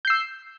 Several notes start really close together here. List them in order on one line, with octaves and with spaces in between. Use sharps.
G6 C7 E6